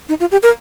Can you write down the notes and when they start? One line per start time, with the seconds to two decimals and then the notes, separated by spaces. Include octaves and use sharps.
0.09 D#4
0.20 F4
0.32 G4
0.43 A#4